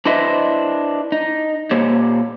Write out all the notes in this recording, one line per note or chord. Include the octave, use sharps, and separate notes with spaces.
D4 E4 B4 C5 D#5 E5
D#4
A#2 A#3 G4 C5 C#5